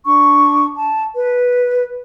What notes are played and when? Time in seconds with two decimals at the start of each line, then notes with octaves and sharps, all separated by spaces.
0.05 D4 C#6
0.76 A5
1.15 B4